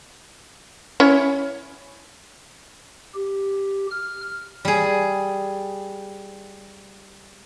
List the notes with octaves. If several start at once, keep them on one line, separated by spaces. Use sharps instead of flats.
C#4 E4 C#5
G4
F6
G3 G#4